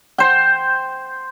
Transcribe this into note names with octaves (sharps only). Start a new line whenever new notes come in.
C5 G5